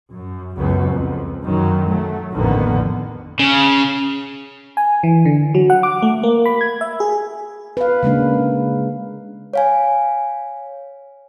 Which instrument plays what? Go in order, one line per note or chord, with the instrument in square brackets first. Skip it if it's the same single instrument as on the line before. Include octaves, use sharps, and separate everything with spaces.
[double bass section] F#2
C#2 F#2 F#3 B3
F2
F#2 D#3 F#3
F#3 A3
A1 F2 D3 D#3 A#3 B3
[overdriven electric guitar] C#3
[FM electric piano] G#5
E3
D3
F#3
F#5
D6
A3
A#3
B5
G#6
E5
G#4
[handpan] B4 F5
C#3 G#3 A#3 D4
[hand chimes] C#5 F5 G#5